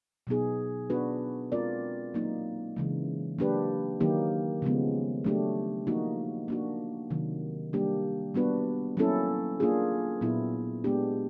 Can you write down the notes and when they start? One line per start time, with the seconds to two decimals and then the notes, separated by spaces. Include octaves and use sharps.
0.27 B2 F#3 B3 D#4 G#4
0.90 B3 D4 F#4 B4
1.52 G#3 C4 F4 A#4 D5
2.14 F#3 A#3 D#4
2.77 C#3 E3 G#3
3.39 F#3 A#3 D4 G4 B4
4.00 D#3 F#3 A#3 D#4 G4
4.62 C#3 F3 G#3 B3
5.24 F#3 A3 D4 G4
5.87 F3 A#3 D#4 F#4
6.48 A#3 D4 F#4
7.10 C3 D#3 F#3
7.73 G3 A#3 D4 G4
8.35 G3 B3 D4 F#4 B4
8.97 F#3 A#3 C#4 E4 A4
9.60 A#3 D4 F4 G#4
10.21 A#2 F#3 B3 E4
10.84 G#3 B3 D4 G4